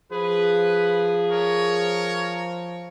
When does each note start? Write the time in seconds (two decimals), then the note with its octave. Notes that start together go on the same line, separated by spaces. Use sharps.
0.12 F3 G#4 B4
1.30 A#4 C#5